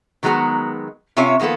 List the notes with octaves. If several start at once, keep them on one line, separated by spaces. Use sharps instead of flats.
D#3 F#3 G#3 B3 F#4 A#5
C3 C4 C#4 F4 C#5 E5
D#3 F3 A#3 B3 A4